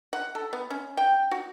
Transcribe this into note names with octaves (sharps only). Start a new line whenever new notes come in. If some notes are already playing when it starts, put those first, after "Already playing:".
F#5
A4
B3
C#4
G5
F#4